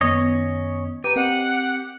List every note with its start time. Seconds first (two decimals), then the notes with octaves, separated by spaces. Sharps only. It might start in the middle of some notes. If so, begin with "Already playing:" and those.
0.01 F#2 D#3 B3 C#4 C#5 D#5
1.04 G4 B4 A#5 D#7
1.16 C4 A#4 D#5 F#5